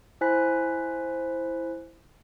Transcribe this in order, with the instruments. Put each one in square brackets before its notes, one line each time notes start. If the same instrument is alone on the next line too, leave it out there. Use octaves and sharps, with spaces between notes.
[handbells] E4 C5 G#5 F#6 B6